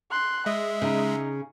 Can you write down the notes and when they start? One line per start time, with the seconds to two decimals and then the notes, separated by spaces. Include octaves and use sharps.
0.11 C6 F#6
0.46 G#3 D#5 E5
0.82 C#3 D#4